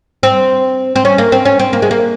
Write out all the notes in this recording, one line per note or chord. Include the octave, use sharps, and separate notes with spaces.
C4
C4
C#4
A#3
C4
C#4
C4
A#3
G#3
A#3